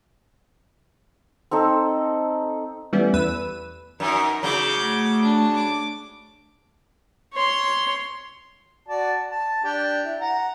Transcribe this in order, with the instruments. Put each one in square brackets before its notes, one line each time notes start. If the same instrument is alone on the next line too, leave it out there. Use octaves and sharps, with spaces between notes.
[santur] C4 D#4 A4
[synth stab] E3 G3 A3 B3 C#4
E2 B4 E6 D#7
[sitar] F#2 [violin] D#4 A#4
[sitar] C#3 F#3 [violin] D6 G6
[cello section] A3
[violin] D4
D6
[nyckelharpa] C#5 C6
[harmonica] F#4 D5 A5
A5
D4 G4 D5
E4
F#5 A#5